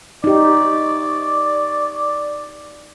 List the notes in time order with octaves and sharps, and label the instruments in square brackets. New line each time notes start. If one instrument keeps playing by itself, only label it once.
[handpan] D#4 G4 [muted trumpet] D5